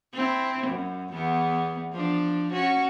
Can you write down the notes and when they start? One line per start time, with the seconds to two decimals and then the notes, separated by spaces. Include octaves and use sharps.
0.14 C4 E4
0.67 F#2
1.12 E2 B3
1.93 F3 D4
2.52 C#4 F#4